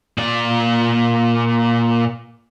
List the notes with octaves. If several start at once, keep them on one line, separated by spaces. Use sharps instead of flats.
A#2 D5